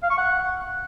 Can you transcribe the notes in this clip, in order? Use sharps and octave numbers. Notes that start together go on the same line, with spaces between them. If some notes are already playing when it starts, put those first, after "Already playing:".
F5
C#6
F#5